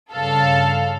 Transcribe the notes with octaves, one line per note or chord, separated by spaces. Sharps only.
G2 C#3 A4 F5